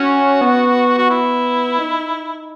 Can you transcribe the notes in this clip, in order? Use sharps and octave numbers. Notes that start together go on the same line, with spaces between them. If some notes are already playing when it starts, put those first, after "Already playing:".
Already playing: C#4 F#4
B3
F#4
E4
D#4